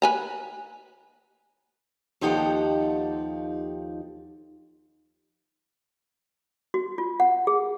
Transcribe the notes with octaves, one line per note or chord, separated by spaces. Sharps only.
B4 G#5 A#5
D#2 F3 D#4 G4 A4 F#5
F#4
F4
F#5
G#4